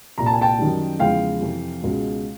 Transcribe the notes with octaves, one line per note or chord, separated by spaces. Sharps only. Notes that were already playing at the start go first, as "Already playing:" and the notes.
C2 A#2 G3 A#5
A5
G#5
G5 A5
F#2 D#3 G3
E2 C#3 F3 G#3 F5 G5
F2 C3 E3
C#2 B2 G#3